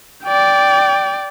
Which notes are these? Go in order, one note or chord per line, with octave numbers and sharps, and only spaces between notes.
D5 G5